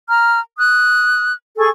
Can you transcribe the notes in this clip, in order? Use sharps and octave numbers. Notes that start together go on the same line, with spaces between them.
A#5 F6
D#6 F#6
G#4 A4 G#5 C#6